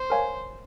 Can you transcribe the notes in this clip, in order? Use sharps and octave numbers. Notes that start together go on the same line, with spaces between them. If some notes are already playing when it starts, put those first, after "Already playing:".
Already playing: C5
A#4 C#5 F5 G#5